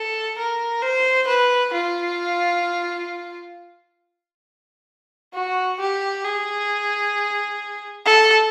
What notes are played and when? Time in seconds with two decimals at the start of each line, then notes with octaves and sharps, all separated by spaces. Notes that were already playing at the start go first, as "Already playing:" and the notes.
Already playing: A4
0.38 A#4
0.82 C5
1.27 B4
1.73 F4
5.34 F#4
5.80 G4
6.24 G#4
8.05 A4